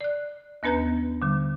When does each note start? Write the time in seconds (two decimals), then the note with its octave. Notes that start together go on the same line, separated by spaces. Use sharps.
0.01 D5 F#6
0.63 D#2 B3 D4 B4 A#5 G6
1.22 D3 G3